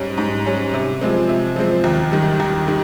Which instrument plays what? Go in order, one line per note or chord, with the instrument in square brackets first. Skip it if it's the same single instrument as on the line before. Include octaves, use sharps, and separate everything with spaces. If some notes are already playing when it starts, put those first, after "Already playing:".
Already playing: [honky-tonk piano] G#2 G3 C#4
G#2
G3 C#4
C3
F3 G#3 C4
C3
F3 G#3 C4
D#2
D#3 G3
D#2
D#3 G3